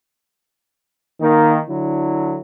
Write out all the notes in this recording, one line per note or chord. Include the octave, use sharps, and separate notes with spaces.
D#3 A#3
D3 F#3 E4